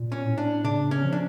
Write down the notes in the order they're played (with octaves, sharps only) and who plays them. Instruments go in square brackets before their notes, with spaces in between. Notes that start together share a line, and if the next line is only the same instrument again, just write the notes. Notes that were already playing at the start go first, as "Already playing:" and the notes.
Already playing: [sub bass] A#2
[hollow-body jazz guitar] C#4
[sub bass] A2
[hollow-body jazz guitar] D4
[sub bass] C#3 [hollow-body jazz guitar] D4
[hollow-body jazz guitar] C#4
[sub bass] F3
[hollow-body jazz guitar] D4